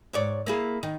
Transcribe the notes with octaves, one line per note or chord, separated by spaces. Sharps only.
G#2 C#5 D5
A#3 E4 G#4
D#3